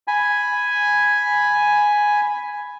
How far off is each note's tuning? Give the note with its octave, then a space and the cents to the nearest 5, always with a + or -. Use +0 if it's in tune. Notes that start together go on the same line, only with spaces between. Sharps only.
G#5 +0 B5 +0